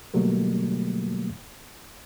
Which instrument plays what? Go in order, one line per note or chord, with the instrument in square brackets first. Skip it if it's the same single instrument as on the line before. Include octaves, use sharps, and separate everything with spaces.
[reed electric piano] B2 D3 F#3 G3 A3 A#3